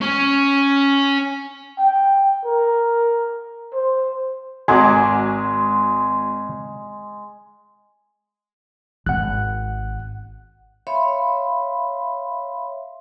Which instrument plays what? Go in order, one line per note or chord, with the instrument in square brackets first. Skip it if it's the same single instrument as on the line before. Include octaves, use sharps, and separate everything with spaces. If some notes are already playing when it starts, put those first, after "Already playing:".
[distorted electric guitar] C#4
[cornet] G5
A#4
C5
[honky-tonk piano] G#1 F#4 D6 [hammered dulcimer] G#3 [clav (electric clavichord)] G#5
[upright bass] G#1 [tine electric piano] F#5 F#6
[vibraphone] C#5 E5 F5 B5 C6